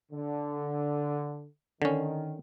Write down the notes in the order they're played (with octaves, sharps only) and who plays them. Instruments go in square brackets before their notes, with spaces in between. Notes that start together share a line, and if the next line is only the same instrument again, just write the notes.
[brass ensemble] D3
[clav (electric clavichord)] D3 C#4 [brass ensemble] D#3